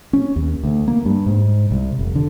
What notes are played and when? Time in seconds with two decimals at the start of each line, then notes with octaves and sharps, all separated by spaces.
0.13 C#4
0.36 D#2
0.63 D2
0.88 A#3
1.05 G2
1.26 G#2
1.71 C2
1.99 F1
2.15 D3